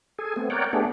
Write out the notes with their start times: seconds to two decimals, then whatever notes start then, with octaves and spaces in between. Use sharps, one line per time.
0.19 G#4 A4 G#5
0.36 A3 B3 C4
0.50 A#4 C#5 D5 F#5 G5
0.73 A3 B3 D4 G4 G#4